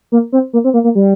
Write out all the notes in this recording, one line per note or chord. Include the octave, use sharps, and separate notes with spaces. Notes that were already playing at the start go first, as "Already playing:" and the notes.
A#3
C4
A#3
C4
A#3
A#3
G3